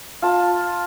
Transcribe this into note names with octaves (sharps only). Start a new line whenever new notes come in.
F4 A5